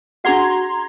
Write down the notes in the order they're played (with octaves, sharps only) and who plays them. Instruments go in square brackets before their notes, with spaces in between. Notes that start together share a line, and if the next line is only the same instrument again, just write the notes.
[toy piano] D4 G#4 F#5 [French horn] F#4 [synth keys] A#5 C6 G#6